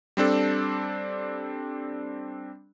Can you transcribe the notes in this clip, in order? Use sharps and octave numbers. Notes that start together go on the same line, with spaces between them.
G3 C4 D4 A4